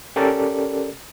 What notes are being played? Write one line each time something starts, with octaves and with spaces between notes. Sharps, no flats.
C#4 G4 A4 A#4 D5